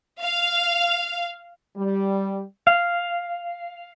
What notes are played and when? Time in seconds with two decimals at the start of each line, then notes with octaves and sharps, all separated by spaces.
0.21 F5
1.76 G3
2.67 F5